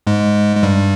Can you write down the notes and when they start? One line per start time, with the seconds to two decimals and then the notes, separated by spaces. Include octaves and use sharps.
0.07 G#2 G#3
0.56 G#3
0.63 G2 G3